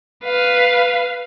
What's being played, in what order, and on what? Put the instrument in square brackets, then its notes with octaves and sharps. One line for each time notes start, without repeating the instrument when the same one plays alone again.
[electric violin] B4 F5